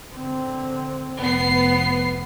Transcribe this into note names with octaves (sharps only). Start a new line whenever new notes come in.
D3 C4
F1 B3 C7